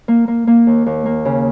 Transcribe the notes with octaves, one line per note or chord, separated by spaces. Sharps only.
A#3
A#3
A#3
D#2
D#2
A#3
C#3